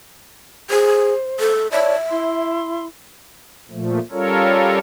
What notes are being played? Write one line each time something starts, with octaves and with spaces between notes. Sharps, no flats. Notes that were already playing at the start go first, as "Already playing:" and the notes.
G#4 C5
A4
C#5 D5 E5 A5
E4 C6
A#2 F3 A3
G3 C#4 F4 A4 A#4 C#5